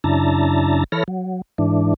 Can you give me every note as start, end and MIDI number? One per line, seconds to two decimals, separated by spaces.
0.04 0.84 42
0.04 0.84 49
0.04 0.84 62
0.04 0.84 64
0.04 0.84 81
0.04 0.84 82
0.92 1.04 52
0.92 1.04 69
0.92 1.04 73
0.92 1.04 83
0.92 1.04 89
0.92 1.04 94
1.08 1.42 54
1.58 1.94 44
1.58 1.94 52
1.58 1.94 62